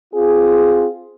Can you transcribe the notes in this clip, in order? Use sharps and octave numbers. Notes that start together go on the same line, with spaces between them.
C4 F4 G#4